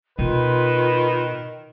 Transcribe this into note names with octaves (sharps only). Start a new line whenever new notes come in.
B2 D#3 F4 B4